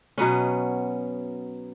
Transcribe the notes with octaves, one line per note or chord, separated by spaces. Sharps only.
B2 F#3 B3 C#4